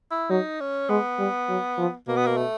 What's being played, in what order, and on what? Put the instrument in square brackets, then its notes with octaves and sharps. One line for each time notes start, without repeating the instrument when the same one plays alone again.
[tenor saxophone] E4
[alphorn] F#3 [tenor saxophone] D#4
[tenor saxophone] C#4
[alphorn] G#3 [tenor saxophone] B3
[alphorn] G3
F#3
F3
[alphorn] B2 [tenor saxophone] A#3
[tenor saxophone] B3
A#3
A3